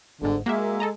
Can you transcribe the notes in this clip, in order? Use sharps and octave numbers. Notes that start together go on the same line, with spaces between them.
G1 G#2 D3
G#3 A#3 F#4 E5
A4 D#5 A#5